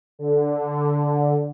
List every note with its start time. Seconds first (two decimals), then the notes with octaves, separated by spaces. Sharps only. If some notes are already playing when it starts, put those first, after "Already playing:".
0.19 D3